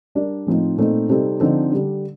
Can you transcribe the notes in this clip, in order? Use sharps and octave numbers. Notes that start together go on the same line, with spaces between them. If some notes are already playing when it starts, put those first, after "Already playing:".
G3 D4 G4 A#4
A2 F3 C4 D#4
A#2 A3 C4 D#4
C3 G3 C4 D#4 A4
D3 F3 C4 D#4 A4
D3 G3 D4